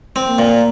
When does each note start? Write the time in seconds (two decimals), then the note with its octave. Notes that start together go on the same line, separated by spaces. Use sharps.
0.16 C4
0.27 A#3
0.39 A#2